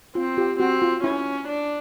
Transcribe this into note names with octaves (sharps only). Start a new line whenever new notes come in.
C4 F4
F4 G4
C4 F#4
F4
C#4 E4
D4